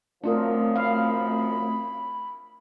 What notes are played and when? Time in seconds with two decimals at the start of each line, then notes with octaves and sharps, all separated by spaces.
0.24 F#2 F3 A3 C4 D4 F4 A#4 D#6
0.76 F5 B5